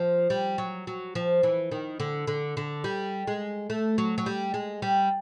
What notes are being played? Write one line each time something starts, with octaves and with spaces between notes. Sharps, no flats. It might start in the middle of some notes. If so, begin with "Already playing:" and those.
Already playing: F3
G3
F#3
F#3
F3
E3
D#3
D3
D3
D3
G3
G#3
A3
F#3
F#3
G3
G#3
G3